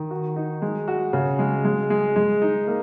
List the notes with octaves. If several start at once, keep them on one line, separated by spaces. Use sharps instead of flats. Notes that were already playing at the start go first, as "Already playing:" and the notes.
Already playing: D#3
F#4
D#4
G#3
F#4
C#3
G#3
G#3
G#3
G#3
D#4
A#3